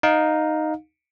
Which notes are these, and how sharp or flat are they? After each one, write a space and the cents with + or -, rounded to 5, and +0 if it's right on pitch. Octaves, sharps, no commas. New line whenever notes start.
D#4 -5 F5 +20